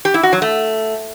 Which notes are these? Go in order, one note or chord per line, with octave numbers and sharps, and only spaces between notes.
G4
E4
F#4
F#3
A3